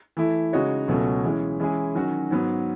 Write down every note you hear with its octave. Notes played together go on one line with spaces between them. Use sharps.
E3 A3 E4
C#3 G#3 D#4 F#4 C#5
C#2 B2 F#3 A3 C#4
E3 G#3 C#4
E3 G#3 C#4 E4 G#4
D#3 F#3 C#4 F#4
G#2 F#3 B3